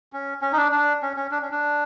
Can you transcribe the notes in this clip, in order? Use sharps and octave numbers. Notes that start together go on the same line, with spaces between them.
C#4
C#4
D#4
D4
D4
C#4
C#4
D4
C#4
D4